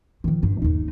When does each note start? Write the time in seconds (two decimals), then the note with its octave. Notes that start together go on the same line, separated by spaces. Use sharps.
0.24 D#3 F3
0.43 G2
0.62 D#2 D#4